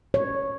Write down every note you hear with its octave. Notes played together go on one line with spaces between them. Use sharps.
C#5